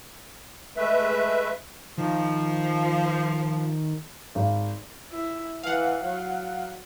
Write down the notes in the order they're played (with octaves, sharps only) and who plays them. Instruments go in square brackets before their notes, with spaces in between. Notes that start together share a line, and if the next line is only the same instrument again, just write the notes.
[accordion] G#3 A3 B4 E5
[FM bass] D#3 [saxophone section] F3
[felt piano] G#1
[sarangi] E4
[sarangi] E3 [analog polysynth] F5 F#5
[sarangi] F#3